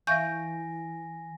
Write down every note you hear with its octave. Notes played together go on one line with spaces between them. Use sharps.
E3 E5 F5 G#5 C#6 G6 A#6